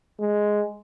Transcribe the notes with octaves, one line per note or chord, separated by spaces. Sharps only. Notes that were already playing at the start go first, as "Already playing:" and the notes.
G#3